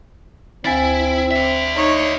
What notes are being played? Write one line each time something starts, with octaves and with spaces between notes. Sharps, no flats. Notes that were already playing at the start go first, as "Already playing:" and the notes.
D2 C4 E4 G#5 A6
D4 E5
D#4 C#5